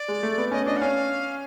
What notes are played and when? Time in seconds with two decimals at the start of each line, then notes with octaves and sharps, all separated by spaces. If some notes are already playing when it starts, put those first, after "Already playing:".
Already playing: D5
0.08 G#3
0.23 A3
0.38 B3
0.51 C#4 D#5
0.67 D4 D#5
0.77 F#5
0.81 C#4 F5